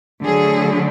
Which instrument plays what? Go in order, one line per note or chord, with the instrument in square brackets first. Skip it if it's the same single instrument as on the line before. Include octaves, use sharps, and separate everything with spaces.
[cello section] D3 F#3 A3 G#4